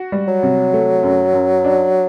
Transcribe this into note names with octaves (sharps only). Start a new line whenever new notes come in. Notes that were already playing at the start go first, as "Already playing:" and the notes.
Already playing: F#4
G3
F#3
C3
A3
F#2
F#2
D4